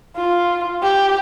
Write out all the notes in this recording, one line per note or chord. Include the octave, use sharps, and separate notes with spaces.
F4
G4